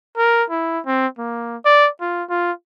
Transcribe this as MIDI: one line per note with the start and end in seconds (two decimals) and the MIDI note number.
0.17 0.43 70
0.50 0.79 64
0.86 1.07 60
1.18 1.57 58
1.65 1.88 74
2.01 2.23 65
2.29 2.52 65